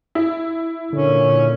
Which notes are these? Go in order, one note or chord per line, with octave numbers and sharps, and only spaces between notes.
E4
A#2 D3 C#4